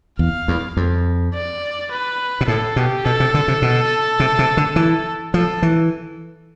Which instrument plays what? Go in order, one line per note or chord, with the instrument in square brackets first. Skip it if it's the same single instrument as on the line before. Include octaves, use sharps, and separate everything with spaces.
[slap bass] E2 [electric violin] F5
[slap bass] E2
F2
[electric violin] D5
B4
[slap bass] B2
[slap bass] A2 [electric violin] A4
[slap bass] B2 [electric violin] G4
[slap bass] B2 [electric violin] A4
[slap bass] C3
D3
C3
B2
C3
C3
D3
E3
[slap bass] F3 [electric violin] A4
[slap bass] E3